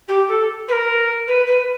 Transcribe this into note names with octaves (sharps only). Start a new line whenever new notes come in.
G4
A4
B4
A#4
B4
B4